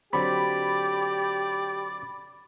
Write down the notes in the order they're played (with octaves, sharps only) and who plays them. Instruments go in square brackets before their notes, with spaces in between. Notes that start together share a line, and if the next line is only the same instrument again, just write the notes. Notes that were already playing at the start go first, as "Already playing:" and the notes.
[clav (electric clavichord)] D3 F#3 C4 [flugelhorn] G4 [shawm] D5 [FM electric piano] B5 D6